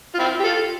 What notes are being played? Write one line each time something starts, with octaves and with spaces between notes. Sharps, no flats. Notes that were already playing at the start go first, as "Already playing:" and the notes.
F4
C4 E4
G4
F4 A4